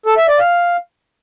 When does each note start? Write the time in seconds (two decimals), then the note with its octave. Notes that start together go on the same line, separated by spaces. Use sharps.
0.06 A4
0.17 E5
0.28 D5
0.39 F5